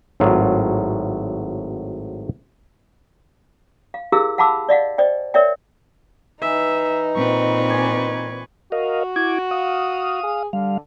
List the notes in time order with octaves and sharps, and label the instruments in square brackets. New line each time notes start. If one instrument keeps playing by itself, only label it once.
[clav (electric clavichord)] G#1 A2 F#3 F4
[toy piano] F5
E4 G4 G#4 A#4 F5 E6
F5 F#5 A5 B5 D6 E6
D5 D#5 F5 F#5
C5 D5 D#5 G5
A#4 C#5 D5 E5 G5
[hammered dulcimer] E3 [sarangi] D#4 [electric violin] E5
[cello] A#2 C4 [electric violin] B4 C#6
[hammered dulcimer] D5 G#5
[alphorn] F#4 [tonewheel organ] A#4 D#5 F5
[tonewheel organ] E4 D6 G#6
F5 D#6
[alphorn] G#4
[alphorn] D3 [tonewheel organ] G3 F5